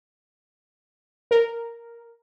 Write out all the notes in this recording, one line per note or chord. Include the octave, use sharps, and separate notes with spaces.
A#4